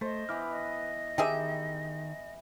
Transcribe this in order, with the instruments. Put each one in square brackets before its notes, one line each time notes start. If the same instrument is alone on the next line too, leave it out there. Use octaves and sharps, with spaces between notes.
[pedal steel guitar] A3 [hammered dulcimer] C5 [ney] D#5
[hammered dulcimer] E3 B3 [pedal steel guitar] B4 D6 F6
[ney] D#5
[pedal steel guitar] D#3 G5 [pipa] G4 G#4 E5